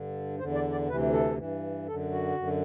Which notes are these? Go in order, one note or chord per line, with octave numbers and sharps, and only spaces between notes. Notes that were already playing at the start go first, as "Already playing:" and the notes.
Already playing: G2 D3
E2 D3 C5
D5
D5
D2 C3 E3 B4
A4
G2 E3
F#2 D3 A4
F#4
F#2 D3